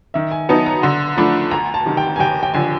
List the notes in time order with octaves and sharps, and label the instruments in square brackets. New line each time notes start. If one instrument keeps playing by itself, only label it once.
[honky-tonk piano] D#3 [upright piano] E5
[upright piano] G#5
[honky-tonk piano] F#3 B3 D#4 [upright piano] A5
[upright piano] A#5
[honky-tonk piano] D3 [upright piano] C6
[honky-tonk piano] F3 A3 D4 [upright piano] B5
[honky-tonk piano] D2 [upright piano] A#5
[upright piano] A5
[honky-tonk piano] C3 D#3
[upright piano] G5
G#5
[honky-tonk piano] D#2 [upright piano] G5
[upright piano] G5
[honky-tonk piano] D3 F3 [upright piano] G#5